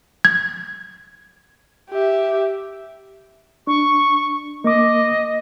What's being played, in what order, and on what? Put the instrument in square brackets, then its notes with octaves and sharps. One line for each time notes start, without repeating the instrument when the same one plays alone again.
[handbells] G#6
[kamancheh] G4 E5
[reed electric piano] D4 [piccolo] C#6
[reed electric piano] A#3 D6 [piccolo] D#5